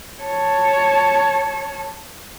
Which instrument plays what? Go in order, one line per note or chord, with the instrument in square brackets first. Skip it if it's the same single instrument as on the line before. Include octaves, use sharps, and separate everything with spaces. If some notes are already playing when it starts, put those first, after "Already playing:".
[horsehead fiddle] C#5 A5